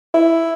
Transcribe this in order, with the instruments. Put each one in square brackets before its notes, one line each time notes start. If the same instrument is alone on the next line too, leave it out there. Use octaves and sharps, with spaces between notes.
[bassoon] E4